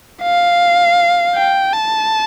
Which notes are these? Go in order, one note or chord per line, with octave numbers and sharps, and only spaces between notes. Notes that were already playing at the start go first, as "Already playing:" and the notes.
F5
G5
A5